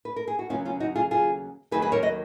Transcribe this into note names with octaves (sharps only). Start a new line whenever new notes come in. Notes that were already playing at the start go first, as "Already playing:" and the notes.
B4
A#4
G#4
F#4
D#2 C#3 F#3 B3 C#4 F4
C#4 F4
D#4 F#4
F4 G#4
F4 G#4
D#2 D#3 F#3 B3 G#4 B4
G#4 B4
A#4 C#5
B4 D#5